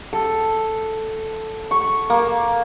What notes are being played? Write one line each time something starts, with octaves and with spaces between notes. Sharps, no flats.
A4
C#6
A#3